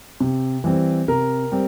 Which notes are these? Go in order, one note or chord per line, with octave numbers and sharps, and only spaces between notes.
C3
E3 G3 C4
C3 A#4
G3 C4